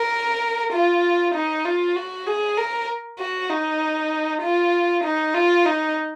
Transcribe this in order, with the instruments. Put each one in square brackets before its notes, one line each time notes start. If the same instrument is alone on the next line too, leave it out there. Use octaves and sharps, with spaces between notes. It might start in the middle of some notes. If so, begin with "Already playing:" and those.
Already playing: [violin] A#4
F4
D#4
F4
F#4
G#4
A#4
F#4
D#4
F4
D#4
F4
D#4